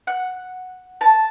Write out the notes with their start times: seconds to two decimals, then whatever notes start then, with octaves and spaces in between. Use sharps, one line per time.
0.07 F#5
1.01 A5